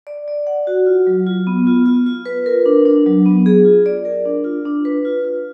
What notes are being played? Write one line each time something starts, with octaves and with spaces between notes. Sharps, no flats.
D5
D5
F#5
F#4
F4
F#3
F4
B3
F4
F4
F4
B4
A#4
D4
D4
F#3
B3
G#4
F4
D5
A#4
D4
F4
D4
B4
F4
F4